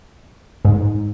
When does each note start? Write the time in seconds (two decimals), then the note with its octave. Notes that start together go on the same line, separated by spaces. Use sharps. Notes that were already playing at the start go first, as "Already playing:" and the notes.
0.65 G#2